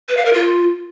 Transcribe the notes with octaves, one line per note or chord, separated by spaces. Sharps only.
B4
F5
A#4
F4